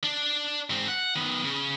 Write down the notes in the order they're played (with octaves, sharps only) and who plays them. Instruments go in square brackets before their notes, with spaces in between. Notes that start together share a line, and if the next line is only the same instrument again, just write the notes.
[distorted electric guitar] D4
G#2 C4
F#5
D#3 B3
C#3